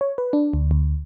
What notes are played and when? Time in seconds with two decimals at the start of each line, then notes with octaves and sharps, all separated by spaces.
0.01 C#5
0.18 B4
0.33 D4
0.53 D2
0.71 D2